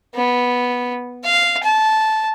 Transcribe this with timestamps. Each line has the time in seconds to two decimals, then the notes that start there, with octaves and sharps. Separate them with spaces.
0.15 B3
1.24 F5
1.63 A5